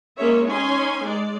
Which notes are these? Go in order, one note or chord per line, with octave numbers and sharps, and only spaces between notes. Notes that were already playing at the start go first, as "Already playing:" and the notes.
G#3 A#3 C#4 G#4 C#5 E5
C#4 D#4 G#5 C6
G#3 D5